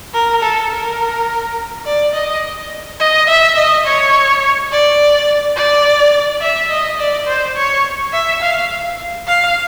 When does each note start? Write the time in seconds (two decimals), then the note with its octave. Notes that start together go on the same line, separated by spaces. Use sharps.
0.14 A#4
0.42 A4
0.71 A#4
1.86 D5
2.14 D#5
3.00 D#5
3.28 E5
3.56 D#5
3.85 C#5
4.71 D5
5.56 D5
6.42 E5
6.70 D#5
6.99 D5
7.27 C5
7.56 C#5
8.13 E5
8.42 F5
9.27 F5